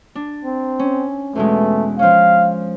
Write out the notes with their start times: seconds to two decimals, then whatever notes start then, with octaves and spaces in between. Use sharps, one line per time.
0.15 D4
0.44 C4
0.79 C#4
1.35 E2 B2 G#3 A3
1.99 F3 C#4 F5